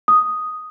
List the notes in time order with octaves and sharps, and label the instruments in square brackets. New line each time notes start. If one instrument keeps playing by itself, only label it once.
[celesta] D#6